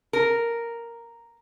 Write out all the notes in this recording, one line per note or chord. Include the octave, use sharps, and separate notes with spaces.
A#4